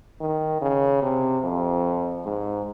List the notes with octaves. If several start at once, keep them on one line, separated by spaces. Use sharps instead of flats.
D#3
C#3
C3
F2
G#2